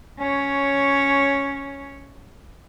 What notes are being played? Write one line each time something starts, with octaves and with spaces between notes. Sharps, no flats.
C#4 C#5